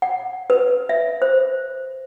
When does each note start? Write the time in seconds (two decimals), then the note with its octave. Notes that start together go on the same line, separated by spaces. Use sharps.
0.02 F#5
0.50 B4
0.89 E5
1.22 C5